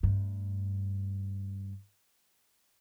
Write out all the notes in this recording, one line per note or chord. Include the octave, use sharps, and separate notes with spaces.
G2 A3